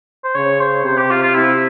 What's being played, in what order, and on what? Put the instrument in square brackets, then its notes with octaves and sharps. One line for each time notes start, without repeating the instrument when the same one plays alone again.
[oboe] C5
[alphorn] C#3 [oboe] C#5
[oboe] C5
[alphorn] C3 [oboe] C5
[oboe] G4
F4
F4
[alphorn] C3 [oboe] E4